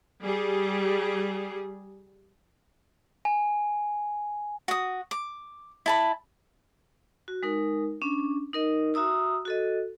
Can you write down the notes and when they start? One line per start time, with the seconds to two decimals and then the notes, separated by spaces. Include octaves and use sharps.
0.22 G3 G#4
3.25 G#5
4.68 F#4 D#6
5.11 D6
5.86 E4 A5 B5
7.28 F#4
7.43 G#3 D#4 A#4
8.02 C#4 D4
8.53 D#4 A#4 D#5
8.94 F#4 E5 A#5 D#6 E6
9.45 F#4 A4 D#5